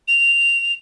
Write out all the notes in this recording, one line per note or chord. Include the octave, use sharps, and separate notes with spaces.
F7